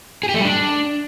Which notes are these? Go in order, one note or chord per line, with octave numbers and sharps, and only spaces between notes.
G#4
G4
A3
G3
D4